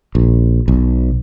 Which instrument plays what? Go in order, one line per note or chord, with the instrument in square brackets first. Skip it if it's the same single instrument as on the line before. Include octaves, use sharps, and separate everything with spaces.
[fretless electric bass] A#1
B1